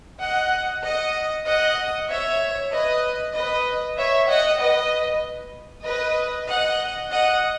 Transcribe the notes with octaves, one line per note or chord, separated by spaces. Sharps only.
D#5 F#5
D#5 F#5
D#5 F#5
C#5 E5
B4 D#5
B4 D#5
C#5 E5
D#5 F#5
B4 D#5
B4 D#5
D#5 F#5
D#5 F#5